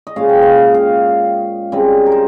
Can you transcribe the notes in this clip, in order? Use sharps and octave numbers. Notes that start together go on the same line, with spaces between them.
D#5
A#2 G#3 C#4 F5
G5
F5
F5
C#3 G3 C4 D#5
A#4
C5